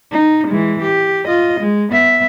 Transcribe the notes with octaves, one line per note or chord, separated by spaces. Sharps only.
D#4
E3 G#3
G4
F4 D#5
G#3
B3 E5